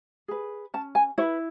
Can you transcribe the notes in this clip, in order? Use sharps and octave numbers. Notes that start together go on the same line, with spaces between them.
G#4 B4
C#4 A5
G#5
E4 B4 C#5